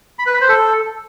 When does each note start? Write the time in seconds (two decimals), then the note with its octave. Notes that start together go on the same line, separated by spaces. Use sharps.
0.19 B5
0.26 B4
0.34 B5
0.41 C5
0.49 A4